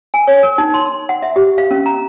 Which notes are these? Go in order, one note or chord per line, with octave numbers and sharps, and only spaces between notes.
G#5
C#5
A#4
D#4
C6
C6
F#5
E5
G4
F5
C#4
A#5